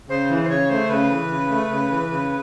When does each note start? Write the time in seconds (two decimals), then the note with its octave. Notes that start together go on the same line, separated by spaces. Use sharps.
0.09 C#3 C5
0.30 E3
0.44 C5
0.49 C#3 C#5
0.69 A3 C5
0.90 C#3 B4
1.11 E3
1.30 C#3
1.50 A3
1.71 C#3
1.90 E3
2.11 C#3